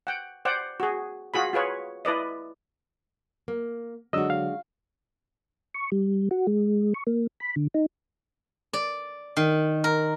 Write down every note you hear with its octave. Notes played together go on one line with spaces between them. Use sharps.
F#5 G5
C5 D5 F#5 G5
F#4 G#4
F4 F#4 G#4 B5
F4 G#4 B4 C#5
E4 B4 D5 D#5
A#3
D3 F#3 G#3 D4 F#4 D#5 E6
F5
C#6
G3
F#4
G#3
C#6
A#3
B5
D3
D#4
D5
D#3
A#4